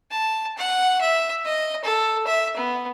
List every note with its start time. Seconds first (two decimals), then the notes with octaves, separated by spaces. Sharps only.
0.10 A5
0.57 F#5
1.01 E5
1.45 D#5
1.84 A4
2.27 E5
2.56 B3